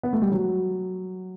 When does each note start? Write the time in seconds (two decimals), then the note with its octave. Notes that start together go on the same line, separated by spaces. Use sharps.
0.03 B3
0.13 A3
0.22 G3
0.32 F#3